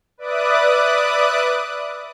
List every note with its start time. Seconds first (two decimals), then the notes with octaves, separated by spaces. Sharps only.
0.18 B4 D5 E5 D6 D#6 F#6